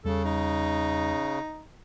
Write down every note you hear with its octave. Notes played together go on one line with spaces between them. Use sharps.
E2 C#3 G3 A4
D#4